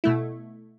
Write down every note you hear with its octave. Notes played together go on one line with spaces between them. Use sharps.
B2 A3 E4